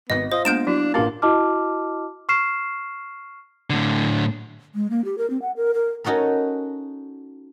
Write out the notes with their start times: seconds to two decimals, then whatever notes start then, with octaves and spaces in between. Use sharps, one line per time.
0.10 G#1 B3 D#5 A#6
0.32 F4 C5 D#5
0.45 G#3 A#3 B3 D4 G6 D7 E7
0.67 F#3 D4 E4 F#4
0.94 A1 A#3 C#4 D4 F4 G4 F5
1.22 E4 F#4 D#5 A5 D6 F6
2.29 C#6 F6 C7 E7
3.70 A2 D3
4.75 G#3
4.90 A#3
5.05 G4
5.18 A#4
5.30 C4
5.42 F#5
5.57 A#4
5.74 A#4
6.04 C#4 D#4 F#4 A4 A#4